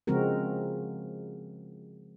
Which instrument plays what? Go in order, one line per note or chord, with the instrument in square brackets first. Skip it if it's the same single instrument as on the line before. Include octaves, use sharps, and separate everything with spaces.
[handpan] C#3 F3 G#3 C4 F#4 A#4